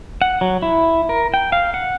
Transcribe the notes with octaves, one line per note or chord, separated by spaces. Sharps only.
F#5
F#3
E4
A#4
G5
F5
F#5